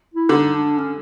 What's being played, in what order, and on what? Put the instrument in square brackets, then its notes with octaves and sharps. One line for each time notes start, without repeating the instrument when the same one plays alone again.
[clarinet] E4
[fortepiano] D3 [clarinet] D#4
[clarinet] D4
C#4